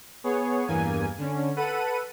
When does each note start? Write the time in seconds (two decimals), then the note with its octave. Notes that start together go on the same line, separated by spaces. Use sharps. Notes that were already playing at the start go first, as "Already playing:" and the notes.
0.24 B3 G#4 C#5
0.67 E2 G2 A#3 G#5
1.18 D3 C#4
1.56 A4 B4 F#5 D#7